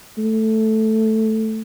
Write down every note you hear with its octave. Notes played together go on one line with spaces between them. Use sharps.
A3